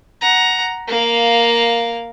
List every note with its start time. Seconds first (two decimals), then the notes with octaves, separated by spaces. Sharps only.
0.21 F#5 A#5
0.88 A#3 F5